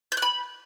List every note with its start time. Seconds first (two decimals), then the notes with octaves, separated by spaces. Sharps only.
0.12 G6
0.17 F#6
0.22 B5